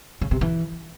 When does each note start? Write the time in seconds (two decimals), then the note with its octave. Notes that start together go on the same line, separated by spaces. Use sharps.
0.21 C#3
0.31 C3
0.41 E3